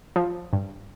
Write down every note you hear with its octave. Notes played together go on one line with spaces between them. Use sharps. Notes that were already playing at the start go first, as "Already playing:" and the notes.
F3
G2